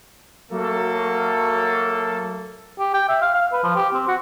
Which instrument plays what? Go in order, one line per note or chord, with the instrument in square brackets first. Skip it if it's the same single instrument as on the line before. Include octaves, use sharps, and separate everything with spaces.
[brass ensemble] F#3 A3 A#3 A4
[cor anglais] G4
G5
E5
F5
F5
B4
F3
G4
C4
F#4